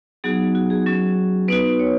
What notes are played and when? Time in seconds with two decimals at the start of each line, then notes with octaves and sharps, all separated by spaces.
0.24 F#3 B3 D#4 F#4 G#4
0.55 F#4
0.70 G#4
0.86 F#3 C#4 F#4
1.48 B3 D#4 F#4 B4
1.79 C#5